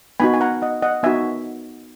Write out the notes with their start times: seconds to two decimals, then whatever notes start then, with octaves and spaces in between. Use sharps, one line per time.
0.20 B3 D#4 F#4 G#5 B5
0.34 G#5
0.41 F#5 A#5
0.62 D#5 F#5
0.82 D#5 F#5
1.03 B3 D#4 F#4 E5 G#5